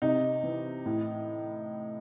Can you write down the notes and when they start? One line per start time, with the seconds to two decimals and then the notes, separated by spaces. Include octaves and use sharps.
0.02 C3 D#4
0.44 E3
0.86 A2